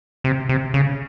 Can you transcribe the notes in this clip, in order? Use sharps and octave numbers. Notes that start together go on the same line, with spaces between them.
C3
C3
C#3